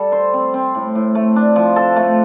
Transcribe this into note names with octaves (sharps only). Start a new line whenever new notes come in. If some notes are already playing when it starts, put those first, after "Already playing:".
Already playing: G3 A4
C5
C4
C4
A2
A2
A3
D4
F3
A4
A3